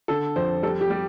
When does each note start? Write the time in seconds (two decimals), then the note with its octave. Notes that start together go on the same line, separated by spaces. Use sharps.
0.08 D3 A4
0.36 F2 C5
0.63 G3 A4
0.81 G4
0.90 G3